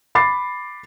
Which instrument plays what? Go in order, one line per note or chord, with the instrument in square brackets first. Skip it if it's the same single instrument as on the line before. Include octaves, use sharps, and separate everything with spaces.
[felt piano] B5 D6 A6 C7